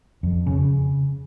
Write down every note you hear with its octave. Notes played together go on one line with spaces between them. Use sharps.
F2
C#3